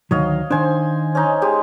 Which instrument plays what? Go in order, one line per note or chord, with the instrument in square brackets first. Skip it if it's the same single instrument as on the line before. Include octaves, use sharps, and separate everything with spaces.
[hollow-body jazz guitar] D2 D#3 F#3 [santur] C#5 D#5 F5
[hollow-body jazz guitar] D#3 D4 [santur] C5 G#5
[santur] C#4 D#4
G#3 G4